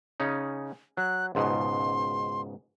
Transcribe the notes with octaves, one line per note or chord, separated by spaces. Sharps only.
C#3 C#4 D#4
F#3 F#6
C#2 G#2 B2 C6